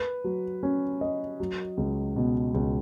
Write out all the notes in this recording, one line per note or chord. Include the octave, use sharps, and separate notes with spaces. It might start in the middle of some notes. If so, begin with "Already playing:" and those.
Already playing: B4
F#3
C#4
D#5
F#3
C#2
B2
C#2